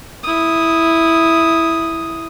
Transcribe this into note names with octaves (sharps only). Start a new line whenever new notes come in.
E4 D#6